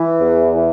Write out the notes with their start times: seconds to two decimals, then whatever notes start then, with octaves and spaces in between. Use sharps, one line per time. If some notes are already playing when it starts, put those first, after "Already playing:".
Already playing: E3
0.20 E2
0.56 E3